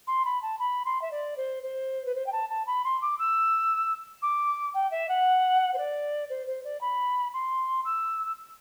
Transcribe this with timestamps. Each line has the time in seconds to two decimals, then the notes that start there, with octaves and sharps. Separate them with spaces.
0.07 C6
0.25 B5
0.42 A5
0.59 B5
0.85 C6
1.02 E5
1.11 D5
1.37 C5
1.63 C5
2.06 B4
2.15 C5
2.26 G5
2.32 A5
2.49 A5
2.67 B5
2.84 C6
3.02 D6
3.19 E6
4.22 D6
4.74 G5
4.91 E5
5.09 F#5
5.74 C5
5.78 D5
6.30 C5
6.47 C5
6.64 D5
6.81 B5
7.34 C6
7.85 E6